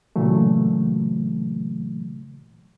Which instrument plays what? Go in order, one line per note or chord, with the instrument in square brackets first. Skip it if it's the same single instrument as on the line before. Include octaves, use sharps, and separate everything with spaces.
[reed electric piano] A#2 C#3 E3 F#3 A3